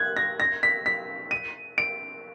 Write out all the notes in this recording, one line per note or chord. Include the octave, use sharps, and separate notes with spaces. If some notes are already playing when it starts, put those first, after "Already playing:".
Already playing: F#6 G#6
A#6
A#6
B6
B6
D#7
D7